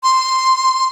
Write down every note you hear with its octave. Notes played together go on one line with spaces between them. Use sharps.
C6